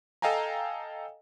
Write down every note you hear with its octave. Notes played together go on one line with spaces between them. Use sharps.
A4 D#5 F5 G5 G#5 A#5